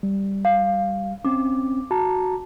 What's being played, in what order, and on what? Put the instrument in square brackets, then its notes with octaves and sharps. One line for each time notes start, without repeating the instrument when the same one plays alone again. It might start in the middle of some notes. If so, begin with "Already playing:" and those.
[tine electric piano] G3
[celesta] F5
[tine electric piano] C4 C#4 [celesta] D6
[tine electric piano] F#4 A5 A#5